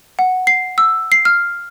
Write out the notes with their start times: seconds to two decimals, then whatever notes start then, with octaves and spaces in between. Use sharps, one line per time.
0.19 F#5
0.47 C7
0.78 E6
1.12 C7
1.25 F6